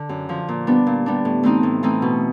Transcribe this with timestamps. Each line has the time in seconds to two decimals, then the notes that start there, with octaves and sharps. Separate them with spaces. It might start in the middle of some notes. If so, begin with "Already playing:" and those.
Already playing: D3
0.09 F#2
0.29 D3 F3
0.48 A#2
0.67 G3 B3 D4
0.87 A#2
1.06 G3 B3 D4
1.25 A2
1.43 E3 A3 C4 D#4
1.63 A2
1.83 E3 A3 C4 D#4
2.02 B2